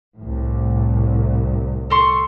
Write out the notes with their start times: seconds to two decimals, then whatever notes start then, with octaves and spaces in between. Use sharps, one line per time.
0.18 C2 A2
1.90 A4 C6 C#6